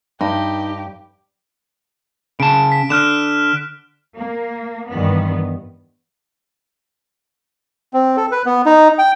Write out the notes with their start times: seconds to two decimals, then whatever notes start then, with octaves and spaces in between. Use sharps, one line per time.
0.21 G2 D#4 G4
2.40 C#3 A5 D7
2.72 B6
2.90 D3 F6 F#6 E7
4.18 A#3
4.90 G2 D#3 E3 B3
7.94 C4
8.17 A4
8.32 B4
8.45 B3
8.66 D#4
8.99 G5